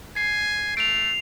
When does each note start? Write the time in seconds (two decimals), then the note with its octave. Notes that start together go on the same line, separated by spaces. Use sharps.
0.16 G#5 C7
0.77 A3 D7 F7